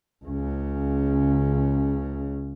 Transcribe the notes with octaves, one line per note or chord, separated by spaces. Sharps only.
C#2 C#3